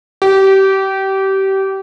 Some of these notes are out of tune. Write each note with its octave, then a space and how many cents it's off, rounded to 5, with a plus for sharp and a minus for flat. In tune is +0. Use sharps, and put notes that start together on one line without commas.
G4 -25